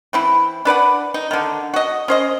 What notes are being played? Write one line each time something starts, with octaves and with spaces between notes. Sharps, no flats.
E3 C4 E4
D4 B4 D5 F#5
D#4
D3 D#3
F#4 D#5
C#4 C5 D#5